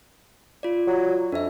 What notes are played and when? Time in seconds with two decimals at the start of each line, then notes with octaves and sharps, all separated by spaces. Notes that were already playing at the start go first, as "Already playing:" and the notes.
0.63 F4 D5
0.87 F#3
1.32 F2 D4 E5